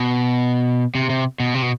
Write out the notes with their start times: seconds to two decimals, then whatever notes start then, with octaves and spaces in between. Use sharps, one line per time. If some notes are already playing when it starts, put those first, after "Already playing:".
Already playing: B2
0.95 C3
1.10 C3
1.40 B2
1.55 C3
1.62 B2